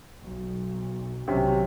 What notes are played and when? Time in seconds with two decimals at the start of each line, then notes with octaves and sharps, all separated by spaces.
0.22 B1
1.28 B1 C3 D#3 F#3 C#4